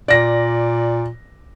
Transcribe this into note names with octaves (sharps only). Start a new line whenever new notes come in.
A#2 D5 A#6